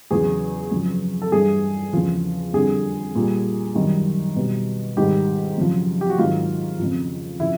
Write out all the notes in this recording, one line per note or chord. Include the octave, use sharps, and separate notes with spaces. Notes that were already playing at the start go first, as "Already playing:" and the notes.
E2 C#3 F#3 G#4
F#2 C#3 F3
A4
G2 E3 G3 G#4
E2 C#3 F3
F2 D3 G3 G#4
A#2 G3
F#2 D#3 G3
B2 G3
G#2 D#3 G3 G4
F#2 C#3 F3
G4
F#4
G#2 D#3 F#3 F4
F2 C#3 F3
C#3 F3 E4